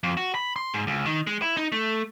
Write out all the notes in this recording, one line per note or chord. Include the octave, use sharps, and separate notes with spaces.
F2
F#4
B5
C6
G#2
C#2
D#3
G#3
E4
D#4
A3